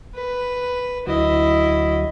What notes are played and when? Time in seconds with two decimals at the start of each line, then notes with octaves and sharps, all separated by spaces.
0.14 B4
1.07 D2 F#3 E4 D#5